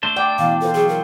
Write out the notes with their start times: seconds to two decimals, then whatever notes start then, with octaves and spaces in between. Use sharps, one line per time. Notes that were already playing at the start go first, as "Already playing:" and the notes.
0.03 A3 D4 C5
0.16 D5 G5
0.39 B2 E3 F5
0.61 F4 A4 C5
0.74 F#3 G#4
0.89 A#4